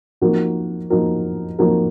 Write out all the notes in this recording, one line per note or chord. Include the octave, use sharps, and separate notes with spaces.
F3 A#3 D#4 F#4 A#4
F3 A#3 D#4 F#4 A#4
F3 A#3 D#4 F#4 A#4